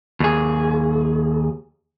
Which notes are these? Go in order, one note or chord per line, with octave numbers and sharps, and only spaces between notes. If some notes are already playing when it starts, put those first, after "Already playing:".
D#2 G#4